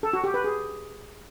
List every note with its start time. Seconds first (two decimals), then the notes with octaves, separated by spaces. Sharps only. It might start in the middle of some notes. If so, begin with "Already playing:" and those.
0.03 A4
0.13 F#4
0.24 G4
0.34 B4
0.44 G#4